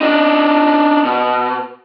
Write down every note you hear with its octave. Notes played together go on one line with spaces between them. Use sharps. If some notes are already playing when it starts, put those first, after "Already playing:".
D4 D#4
B2